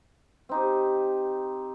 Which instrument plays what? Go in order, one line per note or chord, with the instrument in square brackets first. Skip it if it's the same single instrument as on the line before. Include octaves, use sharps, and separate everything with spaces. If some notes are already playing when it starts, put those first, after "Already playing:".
[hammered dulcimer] C4 D#4 G4